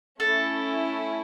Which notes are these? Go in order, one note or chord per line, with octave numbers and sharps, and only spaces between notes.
A3 C#4 E4 A4